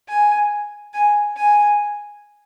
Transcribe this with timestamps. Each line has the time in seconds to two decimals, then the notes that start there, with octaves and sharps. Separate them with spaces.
0.08 G#5
0.94 G#5
1.37 G#5